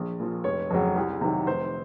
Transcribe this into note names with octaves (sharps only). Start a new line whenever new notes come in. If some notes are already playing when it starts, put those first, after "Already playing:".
Already playing: A#1
A#2 F3
F1 C#5
F2 C#3 F#3
C2
C3 D#3 F#3
F1 C5